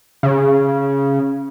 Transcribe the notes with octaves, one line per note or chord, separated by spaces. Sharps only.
C#3